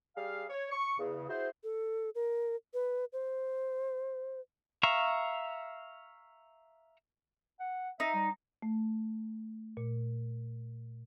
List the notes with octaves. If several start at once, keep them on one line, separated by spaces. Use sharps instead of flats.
G3 G#4 F5
C#5
C#6
E2 C#3
E4 F#4 G#4 C5
A4
A#4
B4
C5
E5 F5 A#5 C#6
F#5
D#4 E5
G3
A3
A#2